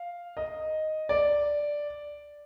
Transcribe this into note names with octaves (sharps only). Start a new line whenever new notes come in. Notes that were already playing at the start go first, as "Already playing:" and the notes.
Already playing: F5
D#5
D5